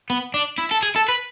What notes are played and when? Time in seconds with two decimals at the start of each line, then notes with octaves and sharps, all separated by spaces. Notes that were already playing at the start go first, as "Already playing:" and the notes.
0.10 B3
0.34 D4
0.58 E4
0.71 A4
0.83 G#4
0.96 A4
1.08 B4